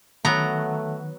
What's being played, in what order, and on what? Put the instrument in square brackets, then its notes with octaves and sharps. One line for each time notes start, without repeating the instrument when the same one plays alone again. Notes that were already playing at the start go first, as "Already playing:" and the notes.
[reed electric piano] D#3 [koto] F#3 B3 [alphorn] A3 [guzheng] A#5